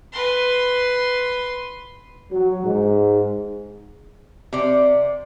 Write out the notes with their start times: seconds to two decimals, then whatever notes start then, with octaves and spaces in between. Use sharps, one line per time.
0.12 B4 C6
2.32 F#3
2.64 G#2
4.53 C3 D5